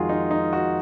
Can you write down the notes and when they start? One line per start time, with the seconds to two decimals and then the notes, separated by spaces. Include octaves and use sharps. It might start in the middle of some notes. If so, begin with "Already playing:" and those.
Already playing: F2 D#3 G#3 F4 F#4 G#4 A#4
0.09 D#4
0.31 D#4
0.53 F#4